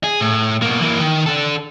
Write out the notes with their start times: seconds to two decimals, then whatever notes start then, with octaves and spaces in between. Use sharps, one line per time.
0.04 G#4
0.20 A2
0.62 B2 A#3
0.80 E3 A#3
1.00 D#3
1.26 D4 A4